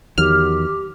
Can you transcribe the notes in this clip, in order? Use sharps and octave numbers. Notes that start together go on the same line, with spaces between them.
E2 D#3 F#3 G4 F6